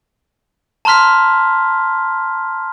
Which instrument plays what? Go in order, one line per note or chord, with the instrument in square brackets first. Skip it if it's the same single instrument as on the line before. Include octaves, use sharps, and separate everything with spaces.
[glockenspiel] A5 A#5 C6 F6 B6